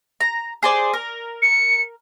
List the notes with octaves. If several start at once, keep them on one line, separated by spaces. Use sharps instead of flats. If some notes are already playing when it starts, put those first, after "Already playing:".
A#5
G#4 C5 D5
A#4
C#7